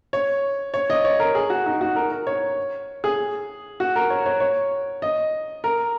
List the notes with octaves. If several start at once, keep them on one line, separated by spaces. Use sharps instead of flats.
C#5
C#5
D#5
C#5
A#4
G#4
F#4
D#4
F#4
A#4
A#4
C#5
G#4
F#4
A#4
C#5
C#5
C#5
D#5
A#4